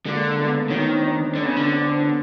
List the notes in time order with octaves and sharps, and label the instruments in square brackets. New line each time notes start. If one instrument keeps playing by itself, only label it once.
[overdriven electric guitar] D3 [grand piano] G#3 A#3
[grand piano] A3 B3
[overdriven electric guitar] D#3 [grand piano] B3 C#4
[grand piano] C4 D4
C#4 D#4
C4 D4
[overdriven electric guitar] D3 [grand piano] B3 C#4
[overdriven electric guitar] C#3
D3
[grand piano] C4 D4
C4 D4
B3 C#4